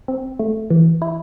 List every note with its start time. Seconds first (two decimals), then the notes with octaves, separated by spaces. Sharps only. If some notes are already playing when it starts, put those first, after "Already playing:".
0.08 C4
0.39 A3
0.70 E3
1.02 E4